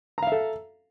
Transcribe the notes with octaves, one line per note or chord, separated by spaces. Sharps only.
A4 E5 F5 A#5